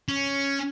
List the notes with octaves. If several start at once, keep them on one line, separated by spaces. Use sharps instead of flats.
C#4